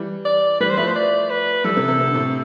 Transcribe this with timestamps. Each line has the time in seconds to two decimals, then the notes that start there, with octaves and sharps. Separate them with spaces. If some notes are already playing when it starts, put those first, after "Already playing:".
Already playing: E3 G3
0.25 D5
0.60 E3 G3 B4
0.70 C5
0.77 F3 A3 B4
0.87 C5
0.95 D5
1.30 B4
1.64 E3 G3 A4
1.76 C3 E3
1.88 C3 E3
1.99 C3
2.07 D3
2.14 A2 C3